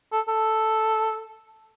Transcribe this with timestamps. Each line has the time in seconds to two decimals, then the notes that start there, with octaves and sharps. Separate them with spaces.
0.12 A4
0.28 A4